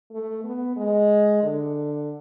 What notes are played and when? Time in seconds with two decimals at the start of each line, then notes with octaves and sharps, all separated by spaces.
0.11 A3
0.44 B3
0.76 G#3
1.43 D3